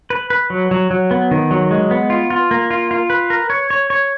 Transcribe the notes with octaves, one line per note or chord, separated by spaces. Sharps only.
B4
B4
F#3
F#3
F#3
B3
D#3
F#3
G#3
B3
F4
F4
A#3
F4
F4
B4
A#4
C#5
C#5
C#5